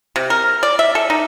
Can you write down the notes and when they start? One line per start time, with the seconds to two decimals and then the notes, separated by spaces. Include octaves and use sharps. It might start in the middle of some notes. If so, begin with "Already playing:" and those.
0.16 C3
0.30 A#4
0.63 D5
0.79 E5
0.95 A4
1.10 D#4